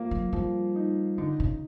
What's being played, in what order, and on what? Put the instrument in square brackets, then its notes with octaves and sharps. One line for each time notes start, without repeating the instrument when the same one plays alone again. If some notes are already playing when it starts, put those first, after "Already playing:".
Already playing: [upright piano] F3 A#3
[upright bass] F#3
[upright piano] F3 [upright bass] G3
[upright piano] D#4
[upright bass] D3 [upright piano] D#4
[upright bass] C#3